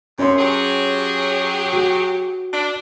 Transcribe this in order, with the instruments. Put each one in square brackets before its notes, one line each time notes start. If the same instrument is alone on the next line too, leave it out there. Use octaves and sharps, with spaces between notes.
[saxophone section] F#2 [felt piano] C#4 C#5 C6
[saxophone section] F#3 G4 G#4
[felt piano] F#4
[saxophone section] D4